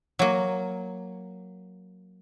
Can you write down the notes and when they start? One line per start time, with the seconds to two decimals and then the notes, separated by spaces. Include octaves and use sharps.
0.19 F#3 A#3